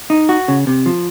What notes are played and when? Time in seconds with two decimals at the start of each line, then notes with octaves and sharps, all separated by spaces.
0.10 D#4
0.29 F#4
0.48 C#3
0.67 C3
0.86 F3